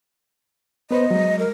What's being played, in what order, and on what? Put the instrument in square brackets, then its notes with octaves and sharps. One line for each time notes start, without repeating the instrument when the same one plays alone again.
[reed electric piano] B3 B4 C5 [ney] D#5
[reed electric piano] F#3 G#3
[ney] A#4